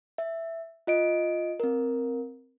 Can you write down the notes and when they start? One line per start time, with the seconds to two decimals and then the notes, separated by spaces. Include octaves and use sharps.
0.18 E5
0.87 F4 D#5 D7
1.60 C4 A#4